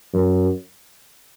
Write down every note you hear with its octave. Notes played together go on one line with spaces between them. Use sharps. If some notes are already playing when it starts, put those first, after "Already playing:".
F#2